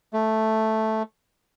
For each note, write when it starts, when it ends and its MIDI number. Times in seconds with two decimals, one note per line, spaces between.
0.13 1.03 57